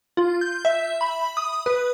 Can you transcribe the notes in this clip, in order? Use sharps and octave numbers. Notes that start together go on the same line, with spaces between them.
F4
G6
E5
B5
D#6
B4